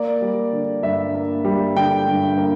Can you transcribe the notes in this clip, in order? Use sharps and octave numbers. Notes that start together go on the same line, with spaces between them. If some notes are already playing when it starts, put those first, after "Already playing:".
Already playing: A#3 D5
G3
D3
G2 E5
A#3
G3
D3 G5
G2
A#3